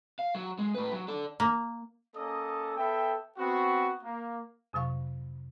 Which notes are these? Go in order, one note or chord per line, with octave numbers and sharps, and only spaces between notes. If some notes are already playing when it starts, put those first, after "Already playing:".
F5
F#3
G#3
A2 B4
F#3
A4 D5
A#3
A#3 C#4 A4 D#5 D#6
B3 A4 E5 G5
B3 C4 F#4
A#3
F2 C3 F#3 F5 C#6